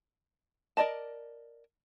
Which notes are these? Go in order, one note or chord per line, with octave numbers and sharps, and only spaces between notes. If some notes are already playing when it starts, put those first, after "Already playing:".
A#4 B4 D5 D#5 A5